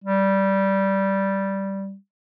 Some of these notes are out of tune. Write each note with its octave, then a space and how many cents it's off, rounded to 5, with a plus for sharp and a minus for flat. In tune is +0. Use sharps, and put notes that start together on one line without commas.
G3 -10